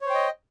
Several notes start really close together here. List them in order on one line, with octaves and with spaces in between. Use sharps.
C#5 C5 G5 D#5